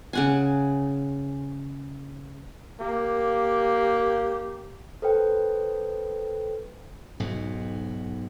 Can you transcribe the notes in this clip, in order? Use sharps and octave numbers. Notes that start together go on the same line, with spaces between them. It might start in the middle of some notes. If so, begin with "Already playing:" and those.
C#3 F#5 G#5
A#3 G4
A4 B4 C5 G5
B1 G#2 B2